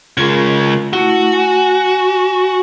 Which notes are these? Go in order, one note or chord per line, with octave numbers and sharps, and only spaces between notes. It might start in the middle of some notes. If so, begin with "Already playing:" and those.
C#3 G#3 F4 A#4
A3 E4 F#4
G#5